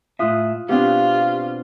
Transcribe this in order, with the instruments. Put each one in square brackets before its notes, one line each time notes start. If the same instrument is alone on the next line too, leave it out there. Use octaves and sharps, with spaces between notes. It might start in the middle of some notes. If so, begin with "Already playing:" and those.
[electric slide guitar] A2 E5 [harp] F4 D#6 F#6
[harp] B2 C4 D4 [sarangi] F4 [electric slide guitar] G4